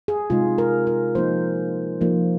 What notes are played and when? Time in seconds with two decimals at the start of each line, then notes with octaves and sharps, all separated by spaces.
0.08 G#4
0.30 C3 G#3 D#4 F4
0.58 A#4
0.87 A#4
1.15 F3 A#3 D#4 C5
2.01 F3 A#3 D#4